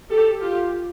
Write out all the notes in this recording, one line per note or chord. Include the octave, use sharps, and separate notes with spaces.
G4 A4
F4 G4